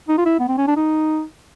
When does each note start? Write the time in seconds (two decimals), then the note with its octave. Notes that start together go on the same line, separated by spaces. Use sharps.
0.08 D#4
0.18 F4
0.25 E4
0.39 B3
0.48 C4
0.58 C#4
0.67 D4
0.77 D#4